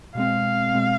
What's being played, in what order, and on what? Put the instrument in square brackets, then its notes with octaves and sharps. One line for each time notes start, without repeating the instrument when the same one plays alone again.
[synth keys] B2 G#3 C4 [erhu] F5
[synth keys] B2 G#3 C4